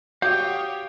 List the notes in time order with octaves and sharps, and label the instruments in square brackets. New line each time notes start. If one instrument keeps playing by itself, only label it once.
[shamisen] F#4 [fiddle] G4 C#5 [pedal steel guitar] F5 D6 D#6 [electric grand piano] G6